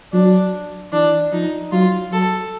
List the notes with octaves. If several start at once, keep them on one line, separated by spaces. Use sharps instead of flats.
F#3 D4
E3 D4
F3 D#4
F#3 F4
F#3 A4